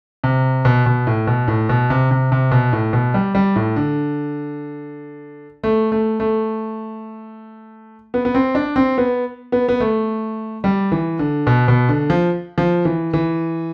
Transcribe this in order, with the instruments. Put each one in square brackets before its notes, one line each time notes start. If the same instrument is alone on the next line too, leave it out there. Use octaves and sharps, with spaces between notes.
[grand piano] C3
B2
B2
A2
B2
A2
B2
C3
C3
C3
B2
A2
B2
G3
G3
A2
D3
A3
A3
A3
B3
B3
C4
D4
C4
B3
B3
B3
A3
G3
E3
D3
B2
B2
D3
F3
F3
E3
E3